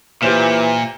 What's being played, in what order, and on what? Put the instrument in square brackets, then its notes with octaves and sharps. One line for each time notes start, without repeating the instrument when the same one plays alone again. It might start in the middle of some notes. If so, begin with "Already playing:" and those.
[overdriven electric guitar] A#2 [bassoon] E3 [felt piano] G4 C5 E7